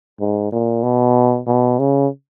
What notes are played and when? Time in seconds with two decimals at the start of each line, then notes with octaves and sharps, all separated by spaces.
0.20 G#2
0.52 A#2
0.84 B2
1.47 B2
1.79 C#3